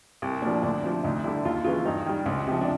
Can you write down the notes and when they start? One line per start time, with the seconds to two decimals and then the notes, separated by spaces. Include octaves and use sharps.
0.22 C2
0.42 A#2 F3 D4
0.63 D2 D4
0.83 C3 F3 D4
1.03 D2 D#4
1.24 D3 G3 E4
1.45 D#2 F4
1.64 C#3 E3 F4
1.85 G2 D#4
2.06 D#3 G3
2.26 C#2
2.47 C3 F3
2.61 D4